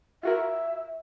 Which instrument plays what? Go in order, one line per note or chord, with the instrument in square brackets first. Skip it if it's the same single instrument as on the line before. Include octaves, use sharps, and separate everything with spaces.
[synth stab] F4 F#4 A#4 [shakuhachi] E5